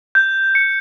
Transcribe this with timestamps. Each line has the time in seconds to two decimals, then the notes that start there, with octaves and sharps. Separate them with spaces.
0.15 G6
0.55 C#7